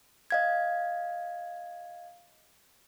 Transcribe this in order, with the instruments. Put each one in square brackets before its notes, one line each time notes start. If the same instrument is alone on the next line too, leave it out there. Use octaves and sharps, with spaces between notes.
[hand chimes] D#5 F5 G#6